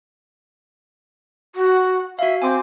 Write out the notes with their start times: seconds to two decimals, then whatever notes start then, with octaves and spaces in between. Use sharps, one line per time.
1.55 F#4
2.19 F#4 E5 F5
2.42 C4 G#5 D6